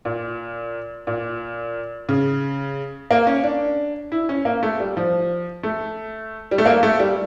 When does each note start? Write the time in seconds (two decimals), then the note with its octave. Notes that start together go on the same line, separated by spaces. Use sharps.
0.05 A#2
1.07 A#2
2.09 C#3
3.11 A#3
3.27 C#4
3.44 D4
4.12 E4
4.29 C#4
4.45 A#3
4.63 A3
4.80 G3
4.97 F3
5.63 A3
6.51 G3
6.58 A3
6.65 A#3
6.83 A3
6.99 G3